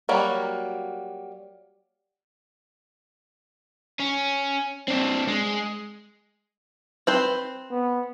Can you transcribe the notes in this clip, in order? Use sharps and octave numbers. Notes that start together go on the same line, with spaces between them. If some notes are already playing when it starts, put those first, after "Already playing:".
F#3 G3 A#3 F#4
C#4
C4 D4
G#3
C4 B4 C5
B3